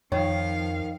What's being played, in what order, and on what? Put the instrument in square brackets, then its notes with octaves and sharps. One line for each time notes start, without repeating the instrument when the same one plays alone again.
[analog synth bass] F2 [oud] D#3 [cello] F3 F5 [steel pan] C#5